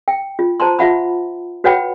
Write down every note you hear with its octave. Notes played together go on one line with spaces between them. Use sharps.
G5
F4
C5 A5 A#5 C6
F4 E5 F#5 B5
F#4 B4 C#5 F#5 G5 B5